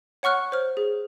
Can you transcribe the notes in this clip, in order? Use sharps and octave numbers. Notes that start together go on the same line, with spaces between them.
C#5 F#5 C#6 F6 F#6
C5 C#5 F6
G#4